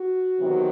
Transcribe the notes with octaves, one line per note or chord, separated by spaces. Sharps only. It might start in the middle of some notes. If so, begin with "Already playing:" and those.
Already playing: F#4
E2 C3 D#3 F#3